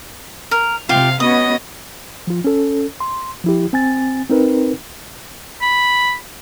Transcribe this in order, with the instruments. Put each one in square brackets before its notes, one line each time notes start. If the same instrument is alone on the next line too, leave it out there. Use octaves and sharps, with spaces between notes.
[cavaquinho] A#4
[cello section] C3 [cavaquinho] F4 G4 [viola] F5
[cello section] B3 C#4 F#4 [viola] D#5 [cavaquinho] D#6
[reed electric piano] F3 F4
C#4 A4
C6
F3 E4 G4
C4 G#5 A6
C4 D#4 A#4 B4
[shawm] B5